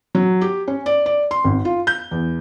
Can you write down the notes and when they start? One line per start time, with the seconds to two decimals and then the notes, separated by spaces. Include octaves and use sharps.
0.15 F#3
0.42 G4
0.67 C#4
0.86 D5
1.06 D5
1.31 C6
1.44 G#1
1.65 F4
1.87 G6
2.11 E2